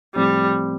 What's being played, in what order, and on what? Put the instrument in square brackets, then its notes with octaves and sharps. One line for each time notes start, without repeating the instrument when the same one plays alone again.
[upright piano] A2 F3 C4 [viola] G3